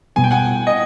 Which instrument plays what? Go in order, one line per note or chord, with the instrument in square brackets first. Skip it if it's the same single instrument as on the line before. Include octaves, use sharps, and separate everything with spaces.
[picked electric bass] B2 G3 B3 [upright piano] G#5
[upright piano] G5
F#5 G#5
D#5